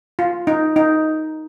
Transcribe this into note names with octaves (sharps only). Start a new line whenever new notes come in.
F4
D#4
D#4